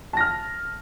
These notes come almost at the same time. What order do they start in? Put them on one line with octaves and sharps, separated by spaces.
A5 A#6 F6